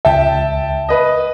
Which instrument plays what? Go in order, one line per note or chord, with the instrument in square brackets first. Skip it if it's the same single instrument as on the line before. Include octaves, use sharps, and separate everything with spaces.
[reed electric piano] C#2 E5 [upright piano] G5 A5
[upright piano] B4 D#5